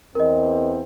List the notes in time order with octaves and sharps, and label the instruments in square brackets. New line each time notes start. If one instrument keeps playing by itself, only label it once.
[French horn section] E2 E3 C4 [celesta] A#4 D#5